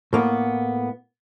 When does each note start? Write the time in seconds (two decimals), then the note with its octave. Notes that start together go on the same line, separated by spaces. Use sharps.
0.13 A2 A#3 B3